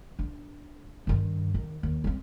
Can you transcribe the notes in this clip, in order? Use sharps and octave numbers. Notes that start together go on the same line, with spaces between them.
D4
G2 D#3
D#3
D#2
G3 C4